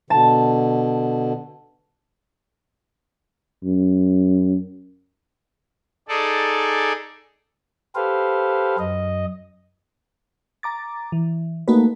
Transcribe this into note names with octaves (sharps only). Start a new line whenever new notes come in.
B2 D3 A5
F#2
D#4 G#4 A4 D5
G4 A4 B4 C5 F5
F#2 D#5
A#5 D6 A6
E3
A3 A#3 D#4 F#4 B4